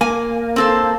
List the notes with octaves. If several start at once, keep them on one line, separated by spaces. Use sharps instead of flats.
A#3 G#5
C4 A4 C5